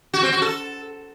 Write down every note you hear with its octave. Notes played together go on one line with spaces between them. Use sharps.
F#4
C4
F#4
A4